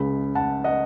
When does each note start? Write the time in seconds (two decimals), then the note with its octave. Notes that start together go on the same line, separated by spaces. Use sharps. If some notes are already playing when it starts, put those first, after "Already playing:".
Already playing: C#2 C#3 G#3 B5
0.35 F#5 A5
0.64 D#5 F#5